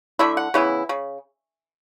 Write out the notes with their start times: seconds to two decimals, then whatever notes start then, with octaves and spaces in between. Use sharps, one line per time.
0.19 D3 A3 E4 E5
0.37 F#5
0.54 C#3 E3 B3 E4
0.89 C#3